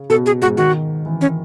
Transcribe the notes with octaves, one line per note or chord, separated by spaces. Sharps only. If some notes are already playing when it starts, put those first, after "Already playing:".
Already playing: C#3
B2 B3 A4
G#4
G#2 G#3 F#4
D#3 F#4
E3
C#4